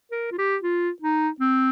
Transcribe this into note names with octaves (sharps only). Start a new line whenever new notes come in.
A#4
F4
G4
F4
D#4
C4